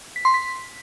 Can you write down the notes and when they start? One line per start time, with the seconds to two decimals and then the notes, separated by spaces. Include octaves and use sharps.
0.16 B6
0.25 C6
0.34 B6